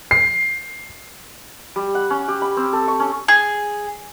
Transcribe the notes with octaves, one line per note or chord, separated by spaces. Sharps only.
C7
G3
F#5
C#4
G4
B5
C4
A4
C#6
C#4
G#4